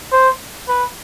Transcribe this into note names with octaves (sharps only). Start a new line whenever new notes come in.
C5
B4